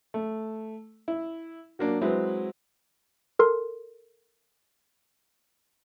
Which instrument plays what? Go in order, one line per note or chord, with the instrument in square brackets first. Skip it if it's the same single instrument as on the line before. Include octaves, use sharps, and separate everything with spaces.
[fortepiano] A3
E4
F#3 A#3 D4
F#3 G#3 C4 E4 B4
[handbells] A4 A#4 C6